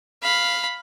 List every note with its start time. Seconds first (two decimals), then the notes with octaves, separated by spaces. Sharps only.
0.23 F5 B5